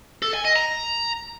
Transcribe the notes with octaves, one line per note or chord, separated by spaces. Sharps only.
A4
G#5
D#5
A#5